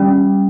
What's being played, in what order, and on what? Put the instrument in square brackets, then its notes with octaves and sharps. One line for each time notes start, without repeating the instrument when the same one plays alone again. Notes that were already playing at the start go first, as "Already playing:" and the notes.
Already playing: [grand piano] G3 [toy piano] C#4